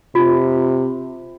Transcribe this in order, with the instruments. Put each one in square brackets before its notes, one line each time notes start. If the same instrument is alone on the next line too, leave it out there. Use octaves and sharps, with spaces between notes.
[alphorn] C3 [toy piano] F4